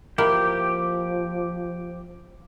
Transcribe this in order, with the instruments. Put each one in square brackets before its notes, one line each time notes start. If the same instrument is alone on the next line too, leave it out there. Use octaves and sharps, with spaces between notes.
[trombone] F3 [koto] A#3 E4 [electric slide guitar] G4